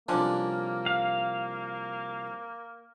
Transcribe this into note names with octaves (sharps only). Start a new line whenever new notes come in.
C2 D3 F3 A#3 C#4 D4
F5